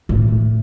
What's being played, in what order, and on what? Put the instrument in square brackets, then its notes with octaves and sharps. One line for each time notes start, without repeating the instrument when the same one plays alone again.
[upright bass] A2